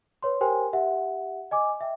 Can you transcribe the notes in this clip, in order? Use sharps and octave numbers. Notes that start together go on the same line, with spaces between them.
B4 C#5 C6
G4 A#4 C5 G5 G#5 C6
G4 E5 F#5
D#5 G#5 D6
E5 G5